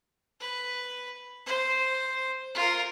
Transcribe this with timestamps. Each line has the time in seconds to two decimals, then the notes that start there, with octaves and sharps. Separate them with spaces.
0.40 B4
1.46 C5
2.55 F4 A#4